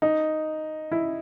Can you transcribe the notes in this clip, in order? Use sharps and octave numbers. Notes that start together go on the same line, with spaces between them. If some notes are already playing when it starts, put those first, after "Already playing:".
D#4
E4